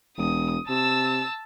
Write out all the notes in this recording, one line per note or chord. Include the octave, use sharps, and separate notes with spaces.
E1 D#6
C3 A5 E6